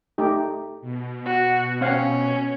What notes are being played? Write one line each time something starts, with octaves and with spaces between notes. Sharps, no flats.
A3 D#4 G4
B2
F#4
C4 C#4 F5 F#5